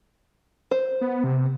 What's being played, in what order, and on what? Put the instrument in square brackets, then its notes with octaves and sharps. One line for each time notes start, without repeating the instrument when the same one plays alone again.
[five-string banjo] C5
[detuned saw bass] B3
C3